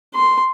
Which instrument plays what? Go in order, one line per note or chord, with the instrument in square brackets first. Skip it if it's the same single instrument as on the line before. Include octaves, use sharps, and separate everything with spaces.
[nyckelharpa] C6